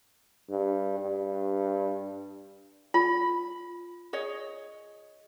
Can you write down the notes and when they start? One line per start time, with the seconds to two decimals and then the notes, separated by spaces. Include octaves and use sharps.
0.49 G2
1.00 G2
2.94 F4 B5
4.13 G#4 C#5 D#5